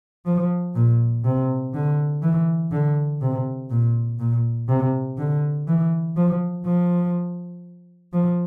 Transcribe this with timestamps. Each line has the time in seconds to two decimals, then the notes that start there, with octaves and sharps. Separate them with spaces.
0.26 F3
0.75 A#2
1.24 C3
1.74 D3
2.22 E3
2.72 D3
3.21 C3
3.70 A#2
4.19 A#2
4.68 C3
5.18 D3
5.67 E3
6.16 F3
6.65 F3
8.13 F3